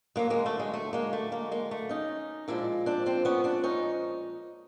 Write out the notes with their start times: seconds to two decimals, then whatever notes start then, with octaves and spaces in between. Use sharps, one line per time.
0.16 D3 F#3 G#3 A#3
0.30 G#3 A#3
0.46 A3
0.59 G#3
0.74 A3
0.93 G#3 A#3
1.13 A3
1.32 G#3 A#3
1.51 G#3 A#3
1.71 A3
1.89 C#4 D#4
2.48 A#2 F3 G#3 D4 E4
2.86 C4 D4
3.06 C4 D4
3.25 B3 C#4
3.44 C4 D4
3.64 C#4 D#4